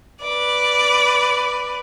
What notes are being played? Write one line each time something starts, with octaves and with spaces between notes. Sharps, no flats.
B4 D5